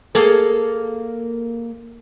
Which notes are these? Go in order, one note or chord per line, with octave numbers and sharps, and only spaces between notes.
A#3 G#4 A4